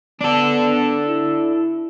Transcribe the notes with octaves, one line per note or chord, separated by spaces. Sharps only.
B3 D4 A4
E4